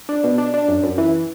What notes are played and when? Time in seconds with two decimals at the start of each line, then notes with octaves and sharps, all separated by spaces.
0.09 D4
0.24 B2
0.38 D4
0.54 D4
0.69 F#2
0.83 F#2
0.98 E3